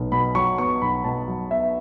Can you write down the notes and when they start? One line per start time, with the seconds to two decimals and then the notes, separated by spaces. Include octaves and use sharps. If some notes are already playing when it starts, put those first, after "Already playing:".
Already playing: B1 B3
0.12 B2 B5
0.35 F#3 C#6
0.58 B3 C#6
0.82 B1 B5
1.04 B2 A5
1.28 F#3
1.51 B3 E5